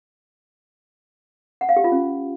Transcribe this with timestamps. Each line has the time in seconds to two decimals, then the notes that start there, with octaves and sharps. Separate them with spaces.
1.61 F#5
1.69 F5
1.76 G4
1.84 F4
1.92 C#4